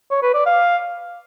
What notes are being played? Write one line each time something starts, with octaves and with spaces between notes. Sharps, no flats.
C#5
B4
D5
F5